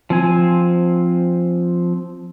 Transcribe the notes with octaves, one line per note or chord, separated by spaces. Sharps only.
F3 C4 G#5